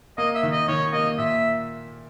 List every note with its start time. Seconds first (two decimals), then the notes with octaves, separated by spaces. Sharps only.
0.18 A#3 D#5
0.35 E5
0.43 D#3
0.52 D#5
0.68 D#3 C#5
0.93 A#3 D#5
1.18 A#2 E5